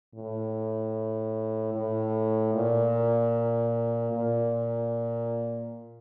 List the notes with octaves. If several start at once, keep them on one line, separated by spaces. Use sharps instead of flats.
A2
A2
A#2
A#2